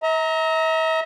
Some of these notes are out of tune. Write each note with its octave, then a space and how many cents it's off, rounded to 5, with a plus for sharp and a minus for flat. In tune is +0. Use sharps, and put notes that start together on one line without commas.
E5 -45 A#5 +0